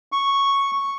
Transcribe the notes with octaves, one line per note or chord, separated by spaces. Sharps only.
C#6